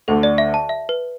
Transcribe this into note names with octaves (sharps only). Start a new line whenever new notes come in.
D2 D3 A3 A4
D5
E5
A5
E5
B4